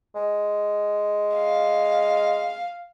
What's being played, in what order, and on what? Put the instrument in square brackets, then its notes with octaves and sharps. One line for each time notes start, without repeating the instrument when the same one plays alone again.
[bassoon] G#3
[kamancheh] F5